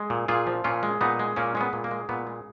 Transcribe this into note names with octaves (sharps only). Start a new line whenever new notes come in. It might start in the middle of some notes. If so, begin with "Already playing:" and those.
Already playing: G#3
A#2
A#2 F4 G#4
F3
A#2 C#4 F4
G#3
A#2 B3 D#4
G#3
A#2 A#3 C#4
G#3 C#4
B3
A#2
A#3
G#3
A#2 B3
G#3